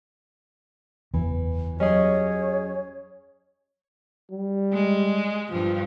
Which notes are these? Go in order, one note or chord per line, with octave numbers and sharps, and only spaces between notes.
F#1 E2 E3
F#3 C#4 G4 G#4 C#5 D#5
G3
G#3
G2 F3